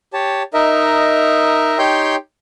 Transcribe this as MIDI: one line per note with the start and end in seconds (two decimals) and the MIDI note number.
0.13 0.43 67
0.13 0.43 73
0.13 0.43 81
0.54 1.78 63
0.54 1.78 70
0.54 1.78 75
0.54 1.78 76
1.78 2.16 63
1.78 2.16 67
1.78 2.16 73
1.78 2.16 79
1.78 2.16 84
1.78 2.16 91